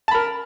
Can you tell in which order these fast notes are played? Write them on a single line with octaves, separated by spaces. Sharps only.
A5 B5 A#4